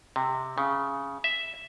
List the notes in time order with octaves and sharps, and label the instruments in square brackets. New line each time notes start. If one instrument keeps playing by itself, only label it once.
[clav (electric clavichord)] C3
C#3
E5